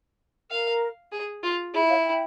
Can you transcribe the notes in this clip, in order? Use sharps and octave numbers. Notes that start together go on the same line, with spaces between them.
A#4 F5
G#4
F4
E4 G#4
C#5 F5
F5
E5 G5